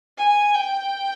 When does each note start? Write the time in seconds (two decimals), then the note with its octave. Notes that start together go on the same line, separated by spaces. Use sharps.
0.18 G#5
0.54 G5